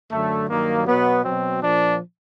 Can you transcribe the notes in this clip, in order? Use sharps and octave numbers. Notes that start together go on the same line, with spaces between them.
F#2 D3 F#3 A3
G2 D#3 F#3 A#3
B2 F#3 B3
B2 F#3 C4
A#2 F3 D4